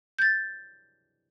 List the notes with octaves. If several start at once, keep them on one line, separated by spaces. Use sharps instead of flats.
G6 A6